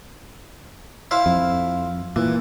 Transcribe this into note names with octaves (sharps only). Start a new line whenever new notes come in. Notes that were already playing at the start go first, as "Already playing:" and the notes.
E4 C5 F5
F2
A#2 E3